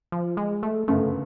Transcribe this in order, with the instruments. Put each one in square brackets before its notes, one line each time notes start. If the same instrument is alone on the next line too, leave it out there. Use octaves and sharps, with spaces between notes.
[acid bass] F3
G#3
A3
[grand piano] G1 F#2 C#3 [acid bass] A3